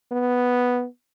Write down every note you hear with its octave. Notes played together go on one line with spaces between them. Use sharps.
B3